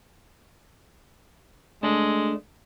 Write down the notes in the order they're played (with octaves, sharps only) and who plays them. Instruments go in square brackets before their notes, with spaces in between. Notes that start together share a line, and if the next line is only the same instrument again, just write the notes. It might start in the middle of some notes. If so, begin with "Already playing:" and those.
[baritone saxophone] G#3 [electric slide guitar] A3 D4